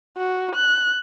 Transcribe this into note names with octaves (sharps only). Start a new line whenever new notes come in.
F#4
F#6